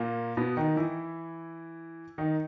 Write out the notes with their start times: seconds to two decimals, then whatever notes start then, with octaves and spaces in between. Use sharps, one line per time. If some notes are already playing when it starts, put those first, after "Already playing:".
Already playing: A#2 A#3
0.37 B2 B3
0.57 D#3 D#4
0.76 E3 E4
2.18 D#3 D#4